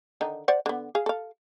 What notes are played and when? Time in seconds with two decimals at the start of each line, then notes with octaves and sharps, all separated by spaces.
0.21 D3 D#3 D#4
0.48 C5 D5 F#5
0.66 D3 B3
0.95 G#4 F5
1.06 A4 F5